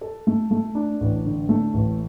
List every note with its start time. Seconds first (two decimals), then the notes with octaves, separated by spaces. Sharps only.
0.01 A4
0.27 A3
0.51 A3
0.75 D4
1.00 A1
1.25 D3
1.49 A3
1.74 A1